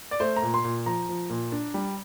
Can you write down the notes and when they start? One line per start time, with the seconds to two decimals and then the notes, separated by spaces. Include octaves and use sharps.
0.11 D5
0.20 A3 C5
0.36 A#5
0.42 A#2
0.54 C6
0.65 A#2
0.86 F3 A#5
1.09 F3
1.30 A#2
1.52 D4
1.74 G3